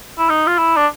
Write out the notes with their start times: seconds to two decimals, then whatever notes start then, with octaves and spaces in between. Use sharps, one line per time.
0.18 E4
0.29 D#4
0.47 F4
0.58 E4
0.76 D4